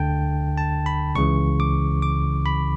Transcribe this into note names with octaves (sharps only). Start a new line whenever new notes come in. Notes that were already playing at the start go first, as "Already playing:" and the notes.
Already playing: D2 D3 G5 A5
A5
B5
C#2 C#3 E3 C#6
D6
D6
B5